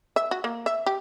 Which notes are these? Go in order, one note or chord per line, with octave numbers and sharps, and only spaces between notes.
E5
F#4
A#3
E5
G4